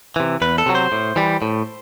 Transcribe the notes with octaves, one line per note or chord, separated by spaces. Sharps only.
C3 E3
E2 B4
A4
C3 F#3
C5
A2
E3 G3
A2